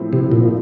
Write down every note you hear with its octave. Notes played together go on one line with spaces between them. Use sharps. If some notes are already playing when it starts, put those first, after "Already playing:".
Already playing: A2 F3 C4
C3
A#2